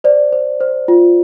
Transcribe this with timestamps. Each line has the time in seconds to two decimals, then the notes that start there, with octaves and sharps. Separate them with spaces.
0.04 C5 D5
0.33 C5
0.60 C5
0.88 F4